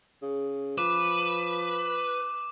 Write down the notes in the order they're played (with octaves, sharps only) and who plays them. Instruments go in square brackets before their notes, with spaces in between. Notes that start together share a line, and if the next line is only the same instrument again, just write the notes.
[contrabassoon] C#3
[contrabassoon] F3 [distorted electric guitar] B4 [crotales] D6